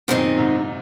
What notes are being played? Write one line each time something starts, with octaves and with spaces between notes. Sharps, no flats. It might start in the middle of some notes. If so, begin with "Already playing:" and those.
F#2 A#2 D#3 G#3 C4 D#4
G#2 C3